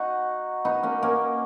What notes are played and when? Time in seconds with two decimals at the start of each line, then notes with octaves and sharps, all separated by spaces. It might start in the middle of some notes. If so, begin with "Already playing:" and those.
Already playing: D#4 F#4
0.65 B3 D#4
0.83 A#3 C#4
1.02 A#3 C#4